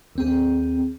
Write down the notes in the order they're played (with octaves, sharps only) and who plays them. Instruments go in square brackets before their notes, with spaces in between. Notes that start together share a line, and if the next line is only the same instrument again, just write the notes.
[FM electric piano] D#2 C4 G#4